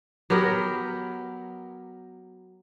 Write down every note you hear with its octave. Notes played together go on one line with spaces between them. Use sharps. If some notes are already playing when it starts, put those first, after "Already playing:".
F#3 B3 G4 A#4